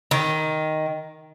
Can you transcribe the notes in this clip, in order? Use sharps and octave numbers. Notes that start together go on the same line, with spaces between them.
D#3